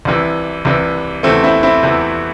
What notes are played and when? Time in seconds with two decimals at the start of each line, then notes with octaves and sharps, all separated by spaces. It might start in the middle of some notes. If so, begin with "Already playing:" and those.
0.05 C2 C3 E3
0.65 C2 C3 E3
1.23 E2 C3 E3 A3 C4
1.44 C4 E4
1.63 C4 E4
1.83 E2 C3 E3